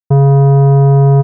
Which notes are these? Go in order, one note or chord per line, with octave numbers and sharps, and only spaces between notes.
C#3